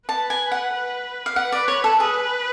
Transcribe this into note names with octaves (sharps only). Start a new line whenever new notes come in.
B4 A5
G#5
F#5
B4
F5
B4 F#5
D5
C#5
A4
G#4 B4